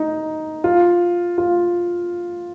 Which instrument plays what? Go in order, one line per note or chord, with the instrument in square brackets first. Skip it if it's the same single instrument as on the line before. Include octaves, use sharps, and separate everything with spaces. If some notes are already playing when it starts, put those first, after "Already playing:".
Already playing: [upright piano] D#4
F4
F4